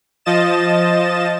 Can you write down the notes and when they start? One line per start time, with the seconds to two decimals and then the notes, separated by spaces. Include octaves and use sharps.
0.25 F3 D#5 A6 E7